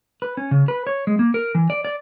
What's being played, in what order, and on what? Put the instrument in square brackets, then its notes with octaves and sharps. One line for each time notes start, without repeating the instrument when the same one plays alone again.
[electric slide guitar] B4
C#4
C#3
B4
C#5
G#3
A#3
A#4
E3
D5
D5